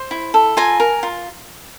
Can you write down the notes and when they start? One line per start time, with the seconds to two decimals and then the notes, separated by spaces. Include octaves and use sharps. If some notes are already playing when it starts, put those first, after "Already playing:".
Already playing: C5
0.11 E4
0.34 A4
0.57 F4 G#5 A#5
0.80 A#4
1.03 F4